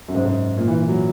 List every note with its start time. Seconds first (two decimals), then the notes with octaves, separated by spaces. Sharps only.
0.08 F#2
0.15 G#2
0.25 G#2
0.57 A#2
0.68 E3
0.78 E3
0.89 F#3